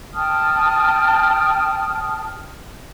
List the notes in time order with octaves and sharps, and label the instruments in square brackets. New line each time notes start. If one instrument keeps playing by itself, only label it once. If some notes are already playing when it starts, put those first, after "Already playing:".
[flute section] G5 A5 D#6 F6